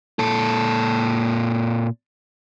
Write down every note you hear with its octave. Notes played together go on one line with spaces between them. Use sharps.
A#2 A4